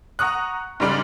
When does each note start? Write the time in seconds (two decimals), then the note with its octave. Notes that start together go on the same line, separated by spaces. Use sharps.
0.19 F#5 A#5 C#6 D#6 F#6
0.80 G#2 C#3 G3 D5 F6